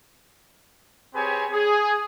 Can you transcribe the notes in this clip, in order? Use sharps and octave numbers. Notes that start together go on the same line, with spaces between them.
C4 G4 G#4 B4 C#5 G#5
G#4